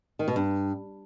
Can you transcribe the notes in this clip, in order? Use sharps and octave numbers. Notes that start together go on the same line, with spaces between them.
D#3
B2
G2